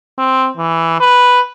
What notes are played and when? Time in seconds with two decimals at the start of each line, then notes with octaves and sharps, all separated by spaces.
0.18 C4
0.57 E3
1.00 B4